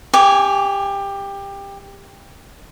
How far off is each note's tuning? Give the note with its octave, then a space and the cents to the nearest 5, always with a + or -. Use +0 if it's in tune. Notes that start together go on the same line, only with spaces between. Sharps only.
G4 +20 G#5 +0 D6 -25